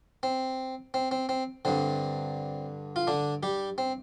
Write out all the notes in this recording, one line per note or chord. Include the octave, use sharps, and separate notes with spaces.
C4
C4
C4
C4
G2 D3 C4
F4
D3 D4
G3 G4
C4